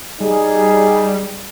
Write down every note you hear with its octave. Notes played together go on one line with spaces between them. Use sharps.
G3 D#4 G#4